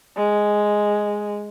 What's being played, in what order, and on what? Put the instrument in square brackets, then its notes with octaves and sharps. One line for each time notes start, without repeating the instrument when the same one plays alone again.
[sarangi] G#3